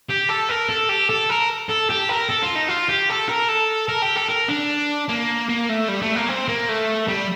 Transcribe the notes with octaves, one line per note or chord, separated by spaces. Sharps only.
G4
A4
A#4
A4
G4
A4
A#4
A4
G4
A#4
A4
F4
D#4
F4
G4
A4
A#4
A4
A#4
G4
A4
A#4
D4
A#3
A#3
A3
G3
A3
A#3
C4
A#3
A3
G3